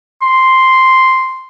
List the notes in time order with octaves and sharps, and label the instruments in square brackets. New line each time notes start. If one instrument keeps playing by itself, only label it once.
[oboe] C6